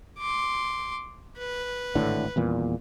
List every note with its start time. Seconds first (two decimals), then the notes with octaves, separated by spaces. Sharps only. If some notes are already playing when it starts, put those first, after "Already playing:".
0.19 C6 D6
1.38 B4
1.95 G#1 A2 D3
2.36 D#1 E2 A#2